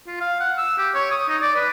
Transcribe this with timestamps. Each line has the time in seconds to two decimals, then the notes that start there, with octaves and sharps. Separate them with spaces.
0.07 F4
0.21 F5
0.40 F#5
0.58 E6
0.78 G4
0.94 C#5
1.11 D#6
1.29 D#4
1.42 D5
1.56 B4